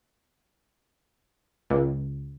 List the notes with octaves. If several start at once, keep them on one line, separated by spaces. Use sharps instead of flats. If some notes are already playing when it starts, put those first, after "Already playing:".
C#2